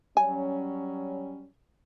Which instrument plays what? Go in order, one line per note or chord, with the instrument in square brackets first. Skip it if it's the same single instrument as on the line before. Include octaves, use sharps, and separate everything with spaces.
[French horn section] F#3 G3 C#4 [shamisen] G#5